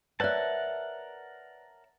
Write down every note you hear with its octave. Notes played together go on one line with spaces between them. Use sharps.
A#4 B4 C#5 D5 E5 F#5 A5 F#6